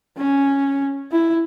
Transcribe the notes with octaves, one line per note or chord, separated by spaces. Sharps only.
C#4
E4